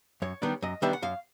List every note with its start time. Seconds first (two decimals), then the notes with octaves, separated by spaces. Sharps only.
0.22 F#2 C#5
0.42 D#3 G3 B3 D4
0.62 F#2 D#5
0.82 D#3 G3 B3 D4 E5
0.93 F#5
1.02 F#2 F5